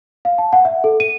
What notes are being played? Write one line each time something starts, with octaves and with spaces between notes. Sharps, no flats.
F5
A5
F#5
E5
A4
D#7